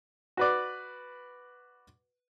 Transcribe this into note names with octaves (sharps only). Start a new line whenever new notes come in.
F#4 B4 D5